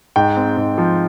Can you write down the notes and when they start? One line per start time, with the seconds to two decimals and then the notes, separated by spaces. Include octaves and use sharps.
0.16 G#2 G5
0.37 C4
0.57 G#2
0.78 F3